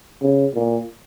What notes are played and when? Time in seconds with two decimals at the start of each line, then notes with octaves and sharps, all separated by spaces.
0.22 C#3
0.55 A#2